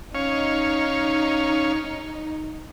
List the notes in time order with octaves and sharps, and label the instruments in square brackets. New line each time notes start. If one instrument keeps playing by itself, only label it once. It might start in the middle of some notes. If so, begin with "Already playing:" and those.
[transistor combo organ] C#4 C#5 F5 [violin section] D#4